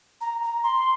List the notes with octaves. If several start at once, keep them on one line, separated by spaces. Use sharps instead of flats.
A#5
A#5
C6